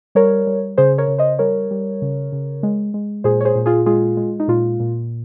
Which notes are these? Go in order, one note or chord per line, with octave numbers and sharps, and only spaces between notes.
G3 A#4 C#5
G3
C#3 G#4 C5
A#4 C#5
C#3
C5 D#5
G3 A#4 C#5
G3
C#3
C#3
G#3
G#3
A#2 G#4 C5
C#5
G#4 C5
A#2
F4 G#4
G#3 F4 G#4
G#3
D#4
A#2 F4
A#2